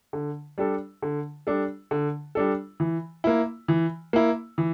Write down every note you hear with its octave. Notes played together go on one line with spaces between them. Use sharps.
D3
G3 D4 A4
D3
G3 D4 A4
D3
G3 D4 A4
E3
A#3 E4
E3
A#3 E4
E3